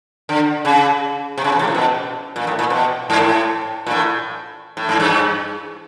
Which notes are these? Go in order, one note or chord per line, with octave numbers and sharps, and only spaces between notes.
D3
C#3
C3
C#3
C3
A2
A#2
B2
A#2
A2
A#2
B2
G#2
A2
A#2
A2
A2
G#2
G2